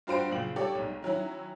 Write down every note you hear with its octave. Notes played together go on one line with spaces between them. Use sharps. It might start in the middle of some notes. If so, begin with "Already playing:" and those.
G2 F4 F#4 C5 G5 D7
F#1 A#2 F4 F#7
G3 G4 A4 C#5 D5
B1 G#2
D#3 F#3 C#4 E4